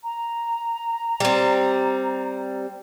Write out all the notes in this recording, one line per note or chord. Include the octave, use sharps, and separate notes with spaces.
A#5
G3 C4